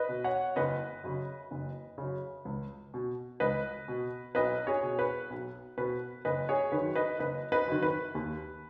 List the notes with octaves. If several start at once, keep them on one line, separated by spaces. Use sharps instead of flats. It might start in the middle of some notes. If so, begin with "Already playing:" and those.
Already playing: B4 D#5
B2
C#5 F#5
F#1 B4 D#5
F#2 C#3
F#1
F#2 C#3
C#2
B2
C#2 B4 D#5
B2
B1 B4 D#5
G#4 C#5
B2
B4
B1
B2 B4
F#1 B4 D#5
G#4 C#5
D#3 B4
F#2
B4 D#5
F#1 B4 D#5
B4 D#5
F#2 D#3
B4
D#2